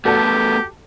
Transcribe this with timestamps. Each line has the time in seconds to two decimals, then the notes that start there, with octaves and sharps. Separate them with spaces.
0.05 A3 B3 F#4 G4 A4 A5